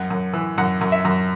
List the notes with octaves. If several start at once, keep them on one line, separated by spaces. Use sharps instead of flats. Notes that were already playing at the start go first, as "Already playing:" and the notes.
Already playing: F#2 F#5
F#2
E3
F#2 F#5
F#2
E5
F#2